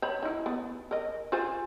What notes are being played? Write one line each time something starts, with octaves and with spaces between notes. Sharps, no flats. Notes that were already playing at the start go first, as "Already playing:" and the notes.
C5 C#5 B5
D#4 E4
B3
A#4 D#5
F4 C5 G#5